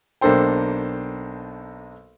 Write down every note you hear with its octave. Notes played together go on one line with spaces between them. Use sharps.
B1 A#3 D4 A4 C5 G5